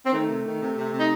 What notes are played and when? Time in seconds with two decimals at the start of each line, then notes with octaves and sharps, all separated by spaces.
0.06 C4
0.13 D#3 A3
0.29 C3
0.45 D#3
0.61 C3
0.77 C3
0.93 C3 D#4